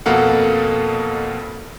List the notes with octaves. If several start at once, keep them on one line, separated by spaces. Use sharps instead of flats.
F2 B2 A#3 A4 F5 F#5